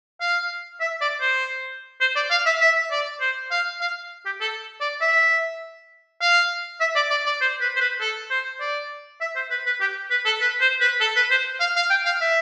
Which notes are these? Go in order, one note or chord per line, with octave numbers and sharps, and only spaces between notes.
F5
E5
D5
C5
C5
D5
F5
E5
E5
D5
C5
F5
F5
G4
A4
D5
E5
F5
E5
D5
D5
D5
C5
B4
C5
B4
A4
C5
D5
E5
C5
B4
B4
G4
B4
A4
B4
C5
B4
A4
B4
C5
F5
F5
G5
F5
E5